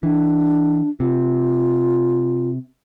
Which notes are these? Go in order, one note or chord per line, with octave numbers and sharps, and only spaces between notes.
E3 D4
C3 F4